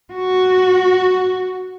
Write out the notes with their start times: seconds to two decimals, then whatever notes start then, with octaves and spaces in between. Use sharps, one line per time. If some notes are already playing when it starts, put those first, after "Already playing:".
0.14 F#4